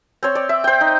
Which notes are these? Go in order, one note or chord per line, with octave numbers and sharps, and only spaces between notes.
C4 C#5
D5
E5
C5 G5
D#4